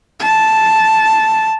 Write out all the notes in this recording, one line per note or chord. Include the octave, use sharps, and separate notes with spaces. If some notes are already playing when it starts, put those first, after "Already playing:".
A5